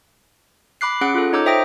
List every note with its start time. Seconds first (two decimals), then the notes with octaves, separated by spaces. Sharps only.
0.81 B5 D6 F#6 C7
1.01 C#4 G#4 F#5 F#6 D7
1.15 F4 A4
1.33 D#4 C#5 A#5 D6 E6 G6
1.46 C5 E5 G5 D#6 A#6 D7